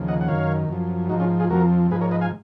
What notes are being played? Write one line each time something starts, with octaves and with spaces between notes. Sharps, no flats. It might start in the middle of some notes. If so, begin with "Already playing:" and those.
Already playing: D#2 C#3 F3
D#5 F#5
F#5
F#2 D#3 C#5 F5
F#2 F3
G#2 F3 D#4 F#4
C#4 F4
F4 G#4
F2 F3 F#4 A#4
G#2 F3 G#4 B4
A#4 C#5
B4 D#5
F5 G#5